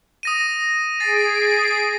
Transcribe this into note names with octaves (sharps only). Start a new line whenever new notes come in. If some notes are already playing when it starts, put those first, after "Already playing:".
D#6 A#6 D#7
G#4 A6 C7 D7